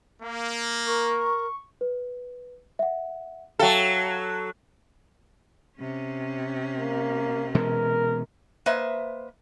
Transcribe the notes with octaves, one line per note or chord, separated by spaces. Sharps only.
A#3
A#4 C#6
B4
E5 F#5
F#3 A4 E5 F5 G5
C3 C#4
A#3
B2 E3 G#3 A#4
A#3 B4 C5 D#5 E5